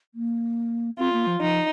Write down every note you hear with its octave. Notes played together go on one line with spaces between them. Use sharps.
A#3
C4 F4
A#3
F3
F3 D#4